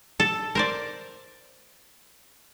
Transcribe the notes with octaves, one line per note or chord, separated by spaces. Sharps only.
A4
A#4 C5 D5